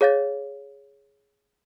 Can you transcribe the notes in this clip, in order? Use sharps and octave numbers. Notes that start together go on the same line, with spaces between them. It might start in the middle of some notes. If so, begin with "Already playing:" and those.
G#4 C#5 F5 G6 A6